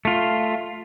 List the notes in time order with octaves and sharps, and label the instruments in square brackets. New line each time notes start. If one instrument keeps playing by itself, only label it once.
[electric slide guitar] A3 F4